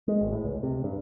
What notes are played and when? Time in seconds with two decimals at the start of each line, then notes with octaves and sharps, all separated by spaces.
0.08 G#3
0.21 G#1
0.33 A2
0.45 C#2
0.63 C3
0.84 G2